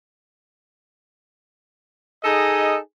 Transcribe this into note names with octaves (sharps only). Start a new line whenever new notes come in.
D#4 G#4 A4 D#5